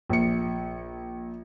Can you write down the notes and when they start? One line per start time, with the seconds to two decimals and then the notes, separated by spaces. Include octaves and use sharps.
0.09 A#1 C#7